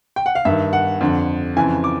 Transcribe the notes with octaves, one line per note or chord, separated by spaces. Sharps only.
G5
F#5
F5
G2 D#3 E5
F#5
F2 D3
F2 C#3 E3 G#5
D6